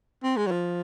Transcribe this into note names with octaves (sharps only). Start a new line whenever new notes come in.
C4
G#3
F#3
F3